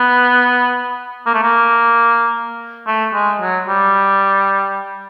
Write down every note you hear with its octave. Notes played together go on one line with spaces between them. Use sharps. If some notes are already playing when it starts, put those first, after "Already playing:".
Already playing: B3
A#3
A3
A#3
A3
G#3
F#3
G3